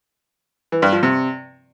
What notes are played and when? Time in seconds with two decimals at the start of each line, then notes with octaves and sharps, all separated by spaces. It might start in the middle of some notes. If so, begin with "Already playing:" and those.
0.72 E3
0.82 G2
0.93 F3
1.03 C3